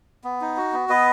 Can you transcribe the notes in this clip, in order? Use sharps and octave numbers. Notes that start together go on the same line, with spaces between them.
B3
D#4
F#4
B3
B3 B4 D#5